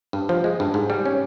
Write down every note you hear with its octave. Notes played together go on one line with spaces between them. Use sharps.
G2
F3
G#3
G2
G#2
G3
C#4